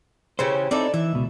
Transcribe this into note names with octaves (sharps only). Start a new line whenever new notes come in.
C#3 E3 C#4 G4 C5
C4 D#4 E4 A4 D5
E3 E5
C#2 B2